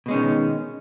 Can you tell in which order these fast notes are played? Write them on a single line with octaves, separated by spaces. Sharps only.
B2 G#3 C#4 D#3